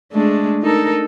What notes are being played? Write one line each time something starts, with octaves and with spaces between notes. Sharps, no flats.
G#3 A3 D4
D#4 A4 A#4